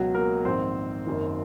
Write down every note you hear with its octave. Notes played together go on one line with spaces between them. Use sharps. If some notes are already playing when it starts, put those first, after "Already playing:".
Already playing: C#2 B2 F#3 F#4
A#3 A#4
A#1 G#2 D#3 C4 C5
F#1 F#2 D#3